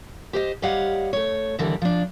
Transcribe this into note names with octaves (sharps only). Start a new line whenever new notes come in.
G4 C5 D#5
G3 G4 C#5 D#5 F5 F#5
A3 C#5
D#2 D3 E3 G3
F3 D4